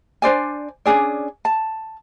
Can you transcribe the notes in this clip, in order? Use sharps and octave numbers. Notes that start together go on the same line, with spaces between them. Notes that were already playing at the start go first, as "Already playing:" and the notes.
D4 C5 D5 G#5
C#4 D4 G#4 D5
A5